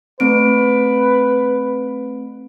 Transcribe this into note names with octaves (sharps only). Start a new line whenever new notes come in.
A3 C4 B4 D7